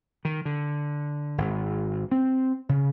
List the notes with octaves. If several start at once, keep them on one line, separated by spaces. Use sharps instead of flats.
D#3
D3
G#1
C4
C#3